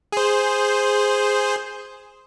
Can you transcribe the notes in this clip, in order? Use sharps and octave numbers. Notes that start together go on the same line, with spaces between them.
G#4 C5